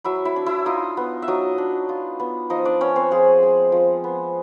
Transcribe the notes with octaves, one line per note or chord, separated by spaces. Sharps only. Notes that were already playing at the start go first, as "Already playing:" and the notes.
F#3 E4 E5
E4 E5
D4
E4 E5
D#4 F4 D#5
B3
E5
F#3 D#4 D#5
D4
F4
B3
F3 D#4 D#5
D4 D5
B3 C#4 C#5
C4 C5
F3 G#3 G#4
G#3
F3
B3